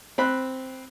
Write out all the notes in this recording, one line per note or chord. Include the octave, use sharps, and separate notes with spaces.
C4 B5 F#6